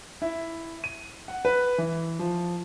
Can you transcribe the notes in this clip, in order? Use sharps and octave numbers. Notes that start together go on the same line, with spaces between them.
E4
D#7
F#5
B4
E3
F3